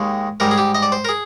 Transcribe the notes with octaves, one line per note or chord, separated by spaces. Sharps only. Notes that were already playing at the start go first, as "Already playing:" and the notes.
Already playing: D#2 D#3 G#3
G#2 G3 A#4
G#4
G4
D#5
D5
C5
A#4
G#4